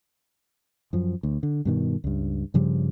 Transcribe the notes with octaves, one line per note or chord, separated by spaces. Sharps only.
F#2 F3
D2
D3
G2 B2 D#3
C#2 G2
G2 C#3 F3 G3